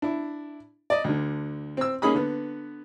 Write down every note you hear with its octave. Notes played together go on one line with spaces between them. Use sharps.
D4 E4
D5 D#5
D2 D3
C4 E6
A#3 C#4 D#4 G#4 B5 D#6
D3 B3